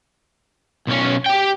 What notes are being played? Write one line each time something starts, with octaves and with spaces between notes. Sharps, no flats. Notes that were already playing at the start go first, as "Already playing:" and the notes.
B1 C#4
G4 G5